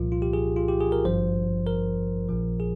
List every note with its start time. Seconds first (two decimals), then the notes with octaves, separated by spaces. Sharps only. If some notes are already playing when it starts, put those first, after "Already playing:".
Already playing: C2 A#2 F3 F4
0.12 F4
0.22 G4
0.33 G#4
0.56 F4
0.68 G4
0.81 G#4
0.92 A#4
1.05 G#1 G2 F3 C5
1.67 A#4
2.29 A#1 A#2 F3
2.60 G#4